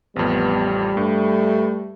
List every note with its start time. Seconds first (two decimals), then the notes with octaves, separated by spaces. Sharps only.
0.16 A1 F2 G3 B3
0.97 G2 A3